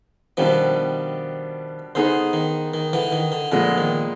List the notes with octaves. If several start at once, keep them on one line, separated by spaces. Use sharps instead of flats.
B2 D#3 F3 G3 B3 D4
D3 B3 D#4 G#4 C5
D#3
D#3
D3 E3
D#3
D3
A#2 D3 F3 G#3 B3
D#3